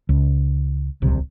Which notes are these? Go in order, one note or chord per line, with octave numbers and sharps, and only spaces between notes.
C#2
D1 C2 C3